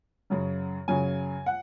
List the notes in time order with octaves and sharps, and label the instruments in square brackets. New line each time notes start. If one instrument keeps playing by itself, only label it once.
[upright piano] F#2 C#3 F#3
F#2 C#3 F#3 G#5
F#5